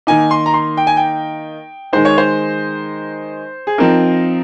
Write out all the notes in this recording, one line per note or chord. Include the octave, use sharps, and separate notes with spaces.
D#3 A#3 D#4 G#5
C6
A#5
C6
G5
G#5
G5
D#3 G#3 D#4 C5
C#5
C5
G#4
F3 C4 D#4 A#4